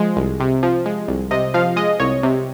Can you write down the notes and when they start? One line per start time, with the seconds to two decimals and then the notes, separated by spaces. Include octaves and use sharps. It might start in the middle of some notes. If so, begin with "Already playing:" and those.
Already playing: F3 G#3
0.17 C2
0.40 C3
0.63 F3
0.86 G#3
1.08 C2
1.31 C3 D#5
1.54 F3 F5
1.76 G#3 D#5
2.00 C2 C#5
2.23 C3